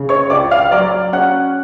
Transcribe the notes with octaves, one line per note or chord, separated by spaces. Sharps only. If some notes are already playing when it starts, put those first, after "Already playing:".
Already playing: C#3
C#5 C#6
C#2 D5 D6
F5 F6
F#3 D5 D6
C#4 F#5 F#6